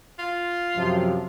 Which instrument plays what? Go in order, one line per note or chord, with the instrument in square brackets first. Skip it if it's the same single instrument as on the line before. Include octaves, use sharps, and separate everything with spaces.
[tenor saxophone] F4
[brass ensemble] F#2 C3 F3